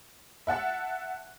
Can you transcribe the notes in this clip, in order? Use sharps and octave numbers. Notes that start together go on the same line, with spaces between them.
E5 F#5 A5 F#6